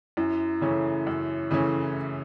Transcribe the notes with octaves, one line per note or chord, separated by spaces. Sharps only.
F#2 E4
C#3 E3 A3 C#4
F#2
C#3 E3 A3 C#4